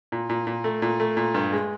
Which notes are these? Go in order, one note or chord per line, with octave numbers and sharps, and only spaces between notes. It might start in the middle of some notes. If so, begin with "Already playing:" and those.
A#2
A#2
A#2
A3
A#2
A3
A#2
G2
G#3